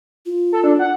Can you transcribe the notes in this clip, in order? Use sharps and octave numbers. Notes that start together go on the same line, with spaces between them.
F4
A4
D4
F#5